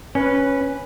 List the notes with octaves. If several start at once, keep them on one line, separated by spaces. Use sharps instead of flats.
C#4 B4